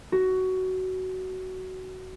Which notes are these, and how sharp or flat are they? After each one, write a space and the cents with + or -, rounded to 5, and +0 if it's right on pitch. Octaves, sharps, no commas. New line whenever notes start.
F#4 +15